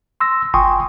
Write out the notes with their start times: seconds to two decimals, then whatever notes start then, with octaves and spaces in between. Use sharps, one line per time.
0.20 C6 E6 A#6
0.54 G1 G5 G#5 C6 C#6 D#6